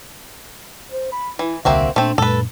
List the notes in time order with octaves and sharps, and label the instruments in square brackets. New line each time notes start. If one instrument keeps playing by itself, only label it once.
[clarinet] C5
B5
[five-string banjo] E3 [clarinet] E4
[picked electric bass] D#1 C2 D3 [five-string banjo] A#3 C4 F#4 [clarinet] E5
[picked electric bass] A#2 [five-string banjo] A3 C4 [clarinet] D4
[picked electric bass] F#2 A#2 D4 [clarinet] G#3 [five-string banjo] A4 B4